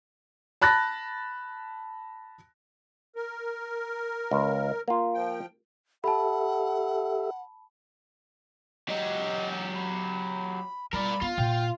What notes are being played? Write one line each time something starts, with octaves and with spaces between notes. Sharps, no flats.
A5 B5 F#6 A6 A#6
A#4
C#2
A#3 F4
F3 G5
G4 A4 E5 F#5 A5 B5
F#3 G4 D#5
B5
G3 A#4 D5 B5
B3 F4
A#2 G5